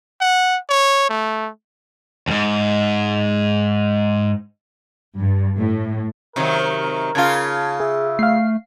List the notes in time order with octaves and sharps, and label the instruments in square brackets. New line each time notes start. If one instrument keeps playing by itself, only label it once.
[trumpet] F#5
C#5
A3
[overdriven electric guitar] F2 G#2
[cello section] G2
A2
[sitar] C3 D#3 F#3 [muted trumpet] A#4
[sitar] C#3 F4 [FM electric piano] F5 A5 G#6
[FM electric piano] G#4 [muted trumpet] E5
[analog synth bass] A3 [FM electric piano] F5 C7